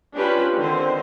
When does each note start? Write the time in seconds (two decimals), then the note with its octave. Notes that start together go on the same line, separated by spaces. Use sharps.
0.15 C#4 D4 F4 G4 B4 C5
0.55 D3 D#3 C4 C5